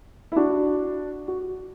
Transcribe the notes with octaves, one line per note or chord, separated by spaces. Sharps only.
E4
D4 F#4
F#4